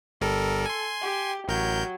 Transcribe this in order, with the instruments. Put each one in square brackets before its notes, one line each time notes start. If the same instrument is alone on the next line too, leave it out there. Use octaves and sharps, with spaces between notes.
[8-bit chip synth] G1 G3 A#4 [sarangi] A4
[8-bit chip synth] G#5 C6
[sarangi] G4
[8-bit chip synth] A1 A#4 G6 [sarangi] F#3